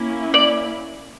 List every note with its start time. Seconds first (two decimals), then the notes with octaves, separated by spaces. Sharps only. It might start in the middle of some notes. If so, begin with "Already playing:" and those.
Already playing: A#3 C#4 E4
0.34 D5